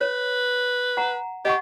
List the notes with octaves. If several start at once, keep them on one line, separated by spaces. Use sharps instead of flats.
B4 C#5
F#5 A#5
G4 D#5 F#5 C#6